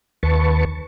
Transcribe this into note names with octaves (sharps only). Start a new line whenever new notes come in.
D#2 B4 A5 C#6